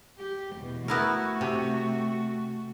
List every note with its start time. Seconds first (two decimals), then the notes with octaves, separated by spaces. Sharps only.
0.18 G4
0.56 E2 B2
0.88 A3 B3 E4 F#4 A#4
1.41 C3